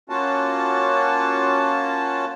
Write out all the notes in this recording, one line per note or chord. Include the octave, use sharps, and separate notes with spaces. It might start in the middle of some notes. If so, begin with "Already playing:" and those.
A#3 C#4 F4 F#4 A5